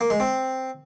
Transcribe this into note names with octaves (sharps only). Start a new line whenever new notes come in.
A#3
G#3
C4